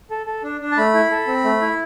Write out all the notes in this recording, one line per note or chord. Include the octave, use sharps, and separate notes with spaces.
A4
A4
D4
D4
A5
A3 B5
E4
A4
C4
A3
E4